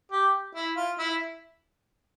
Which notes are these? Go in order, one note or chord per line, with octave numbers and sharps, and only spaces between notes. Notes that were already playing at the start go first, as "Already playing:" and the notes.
G4
E4
F4
E4